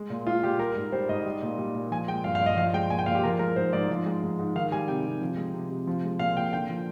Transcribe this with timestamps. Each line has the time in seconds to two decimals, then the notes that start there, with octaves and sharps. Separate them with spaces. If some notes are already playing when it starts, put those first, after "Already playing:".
Already playing: G#3
0.10 A#2
0.27 G#3 F4
0.43 A#2 G4
0.59 G3 A#4
0.76 G#2
0.92 G3 C5
1.09 G#2 D#5
1.26 G3
1.42 A#2
1.58 G3
1.75 A#2
1.91 F3 G#5
2.08 G#3 G5
2.24 G2 F5
2.35 F5
2.41 G2
2.46 D#5
2.57 F3 F5
2.74 G#3 G5
2.90 A#2 G#5
2.99 G5
3.06 A#2 F5
3.15 G4
3.24 F3 A#4
3.39 G#3 A#4
3.56 G#2 C5
3.73 G#2 D5
3.89 F3
4.06 G#3
4.23 G#2
4.39 G#2
4.55 D#3 F5
4.72 G3 G#5
4.88 C3 G5
5.05 C3
5.21 F3
5.37 G#3
5.54 C3
5.71 C3
5.87 F3
6.04 G#3
6.19 A#2 F5
6.37 A#2 G5
6.53 D3 G5
6.70 F3